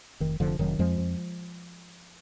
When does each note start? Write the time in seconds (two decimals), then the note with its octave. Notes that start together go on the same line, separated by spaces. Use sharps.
0.20 F1 D#3
0.40 F1 D3 F3
0.59 F1 D#3 F#3
0.79 F2 F3 G#3
0.98 F2